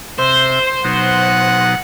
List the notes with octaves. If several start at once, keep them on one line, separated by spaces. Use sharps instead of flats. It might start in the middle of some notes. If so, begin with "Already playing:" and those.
C3 C5 E5
B2 F#3 D#4 F#5